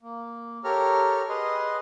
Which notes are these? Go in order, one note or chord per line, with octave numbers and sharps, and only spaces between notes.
A#3
G4 A4 A#4 C#5 A#5 F6
G#4 B4 D#5 C6